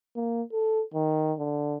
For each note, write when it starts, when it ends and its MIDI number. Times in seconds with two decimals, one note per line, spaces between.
0.16 0.42 58
0.53 0.83 69
0.94 1.33 51
1.39 1.78 50